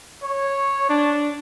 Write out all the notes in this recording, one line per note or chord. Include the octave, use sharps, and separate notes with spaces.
C#5
D4